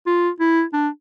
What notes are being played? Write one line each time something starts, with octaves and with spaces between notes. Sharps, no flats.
F4
E4
D4